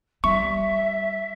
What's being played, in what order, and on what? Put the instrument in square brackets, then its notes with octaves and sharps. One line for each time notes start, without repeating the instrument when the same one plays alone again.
[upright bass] G3 [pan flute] E5 [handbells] C#6